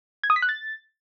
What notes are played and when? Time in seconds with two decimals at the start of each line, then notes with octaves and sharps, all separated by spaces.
0.24 G#6
0.30 D#6
0.36 B6
0.42 F#6
0.49 A6